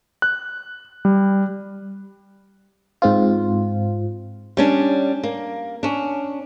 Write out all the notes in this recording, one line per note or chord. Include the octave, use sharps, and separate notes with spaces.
F#6
G3
G#2 C4 F4
G3 C#4 D4
A#3
C#4 D4